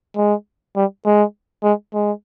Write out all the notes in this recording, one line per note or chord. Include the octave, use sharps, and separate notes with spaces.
G#3
G3
G#3
G#3
G#3